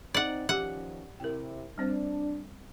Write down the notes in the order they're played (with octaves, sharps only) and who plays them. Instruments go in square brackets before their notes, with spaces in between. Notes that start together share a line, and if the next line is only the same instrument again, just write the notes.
[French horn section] C4 D#4 [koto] D5 F#5
[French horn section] D#3 F3 C#4 [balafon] G4 D6 [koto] F#5
[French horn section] C3 E4 [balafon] A#4 G5
[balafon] G3 C4 C5 [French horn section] D4